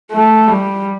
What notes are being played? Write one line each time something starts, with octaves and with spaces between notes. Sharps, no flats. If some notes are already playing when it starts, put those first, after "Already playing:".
A3
G3